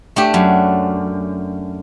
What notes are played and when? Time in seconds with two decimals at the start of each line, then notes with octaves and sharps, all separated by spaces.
0.16 A3 D4 G4
0.34 F#2